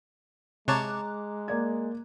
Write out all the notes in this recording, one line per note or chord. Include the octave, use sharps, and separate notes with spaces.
C3 G#3 C#5 A5 A#5 D6 F#6
A#3 D5 G#6